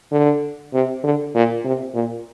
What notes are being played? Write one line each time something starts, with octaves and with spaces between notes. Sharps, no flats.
D3
C3
D3
A#2
C3
A#2